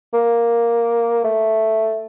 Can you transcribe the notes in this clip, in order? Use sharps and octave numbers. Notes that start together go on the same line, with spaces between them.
A#3
A3